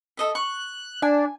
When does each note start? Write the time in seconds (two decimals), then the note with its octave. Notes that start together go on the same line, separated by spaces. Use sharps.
0.17 A4 D#5 E5
0.35 C#6 F#6
1.02 D4 G#5